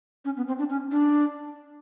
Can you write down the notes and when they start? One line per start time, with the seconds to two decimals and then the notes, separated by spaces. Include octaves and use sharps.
0.25 C#4
0.37 B3
0.48 C4
0.58 D4
0.70 C#4
0.91 D4